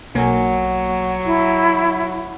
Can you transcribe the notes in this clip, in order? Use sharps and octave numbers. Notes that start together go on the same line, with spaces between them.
B1 F#3 A#3 G#5
E4